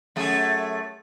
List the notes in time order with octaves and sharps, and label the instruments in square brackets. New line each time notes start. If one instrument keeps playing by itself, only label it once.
[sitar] F#2 A3 G#4